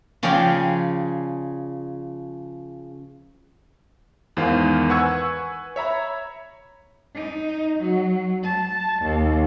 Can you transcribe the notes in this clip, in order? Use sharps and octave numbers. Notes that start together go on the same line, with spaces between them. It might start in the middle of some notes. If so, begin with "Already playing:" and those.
C#3 F3 G#4 D5 F5 G5
E2 G#2 D#3 C5 F5
B4 F#5 G#5 C#6 E6 G#6
C#5 E5 A#5 B5
D#4
F#3
A5
D#2